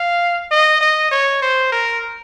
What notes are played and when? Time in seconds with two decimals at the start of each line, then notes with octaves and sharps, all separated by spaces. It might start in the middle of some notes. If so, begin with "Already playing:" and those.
Already playing: F5
0.51 D#5
0.81 D#5
1.11 C#5
1.42 C5
1.72 A#4